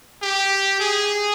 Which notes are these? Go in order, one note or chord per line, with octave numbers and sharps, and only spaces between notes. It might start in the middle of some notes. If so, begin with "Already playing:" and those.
G4
G#4